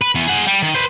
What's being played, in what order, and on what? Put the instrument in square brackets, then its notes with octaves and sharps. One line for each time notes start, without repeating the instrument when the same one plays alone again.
[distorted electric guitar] B4
E3 B3
G#4 F#5
G3
D#3
B4 C5